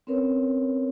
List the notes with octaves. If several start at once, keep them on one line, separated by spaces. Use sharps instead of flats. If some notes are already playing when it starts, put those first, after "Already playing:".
C4 C#4 A#4 B4 C#5